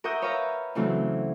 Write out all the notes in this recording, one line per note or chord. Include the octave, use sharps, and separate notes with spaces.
A#4 E5 F#5 C#6 D#6 G6
B4 C#5 E5 F5 A#5
C#3 E3 F#3 A3 C4 D4